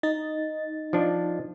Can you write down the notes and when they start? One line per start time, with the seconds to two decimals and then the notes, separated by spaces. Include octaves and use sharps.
0.03 D#4 D#5 A6
0.93 F3 D4